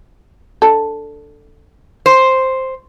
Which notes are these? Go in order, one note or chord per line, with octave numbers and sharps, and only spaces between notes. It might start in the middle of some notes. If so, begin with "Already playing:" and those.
D4 A4
C5